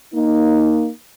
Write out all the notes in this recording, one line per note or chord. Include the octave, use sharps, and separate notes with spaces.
A#3 D#4